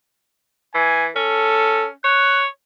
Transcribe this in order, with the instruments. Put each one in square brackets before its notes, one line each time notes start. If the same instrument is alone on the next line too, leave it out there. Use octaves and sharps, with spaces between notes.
[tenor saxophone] E3 [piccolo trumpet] G#5
[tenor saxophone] C#4 [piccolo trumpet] A4
[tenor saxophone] C#5 [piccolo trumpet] F#6